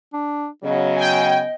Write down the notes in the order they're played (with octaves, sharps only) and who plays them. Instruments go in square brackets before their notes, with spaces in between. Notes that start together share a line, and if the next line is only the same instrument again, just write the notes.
[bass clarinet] D4
[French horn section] C#3 F#3 [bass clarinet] B3 [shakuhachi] D#5
[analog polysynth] G5 G#5